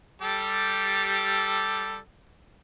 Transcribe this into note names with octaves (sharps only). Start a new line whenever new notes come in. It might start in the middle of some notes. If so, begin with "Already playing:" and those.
G3 G4 A4